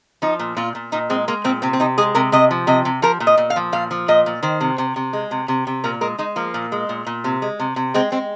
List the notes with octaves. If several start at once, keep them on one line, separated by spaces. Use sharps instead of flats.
F3 D#4
A#2
A#2 F4
A#2
A#2 D#4
G#3 C4
G#3 A#3
A#2 C4
C3 C4
C4
C3 D#4
G#3 G#4
C3 A#4
C3 D#5
F3
C3 D#5
C3
F3 A#4
A#2
D#5
A#2
F5
F3
A#2 F5
F3
A#2 D#5
A#2
D#3 C5
C3
C3
C3
G#3
C3
C3
C3
A#2 A#4
G#3 A#4
G#3 D#4
F3 A#3
A#2
G#3
A#2
A#2
C3
G#3
C3
C3
G#3 C4
G#3 C4